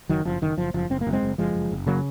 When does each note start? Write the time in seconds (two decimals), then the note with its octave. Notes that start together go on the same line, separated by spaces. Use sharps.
0.09 F#1 D#3 F#3
0.25 F#1 F3
0.42 F#1 D#3
0.57 F#1 F3
0.74 F#1 F3
0.90 F#1 C4
1.01 A#3
1.07 F#1
1.13 G#3 C4
1.23 F#1
1.38 F#1 F3 G#3
1.55 F#1
1.71 F#1
1.86 C#3 F#3 A#3